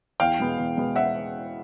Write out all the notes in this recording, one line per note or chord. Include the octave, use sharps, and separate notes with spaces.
E2 F5 G5
B2 G#3 B3
E2
B2 G#3 B3
E5 F#5